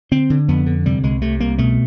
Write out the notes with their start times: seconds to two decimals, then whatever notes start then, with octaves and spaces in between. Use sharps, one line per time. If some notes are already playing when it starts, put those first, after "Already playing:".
0.11 D3 C4
0.30 D3
0.48 F2 B3
0.66 D3
0.86 C3 G3
1.03 C2 G#3
1.21 C3 A3
1.40 C2 A#3
1.58 B2 A3